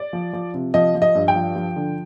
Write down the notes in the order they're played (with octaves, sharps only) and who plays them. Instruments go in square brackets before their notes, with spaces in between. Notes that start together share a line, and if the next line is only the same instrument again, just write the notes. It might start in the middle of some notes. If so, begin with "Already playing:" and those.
Already playing: [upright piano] D5
F3
F3
C3
F3 D#5
F3
D#5
G2
G5
F3
F3
D3